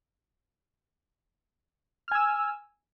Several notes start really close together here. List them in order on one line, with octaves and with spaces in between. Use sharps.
F6 G#5 E6